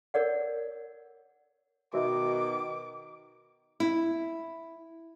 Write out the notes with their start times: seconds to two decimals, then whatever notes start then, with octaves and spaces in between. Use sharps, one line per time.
0.14 A#4 C#5 D5 F#5
1.94 B2 D#3 F#4 A#4 E5 D6
3.80 E4